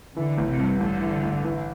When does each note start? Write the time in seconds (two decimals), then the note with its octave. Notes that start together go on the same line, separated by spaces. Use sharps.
0.16 D3 E3
0.38 A1
0.48 C3
0.59 G2
0.80 A1 D3
1.01 E3
1.23 A1
1.44 E3